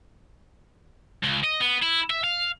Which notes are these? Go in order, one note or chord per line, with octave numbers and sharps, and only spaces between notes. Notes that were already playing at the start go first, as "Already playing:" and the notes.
C#2
D#5
B3
E4
E5
F5